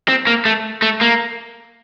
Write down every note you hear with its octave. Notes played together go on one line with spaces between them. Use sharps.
C4
A#3
A3
A3
A#3